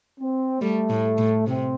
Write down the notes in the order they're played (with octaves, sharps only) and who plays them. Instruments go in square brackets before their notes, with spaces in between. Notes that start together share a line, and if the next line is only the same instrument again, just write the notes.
[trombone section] C4
[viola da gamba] G3 [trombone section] A3
[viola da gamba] A2
A2
[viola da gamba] C3 [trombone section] C4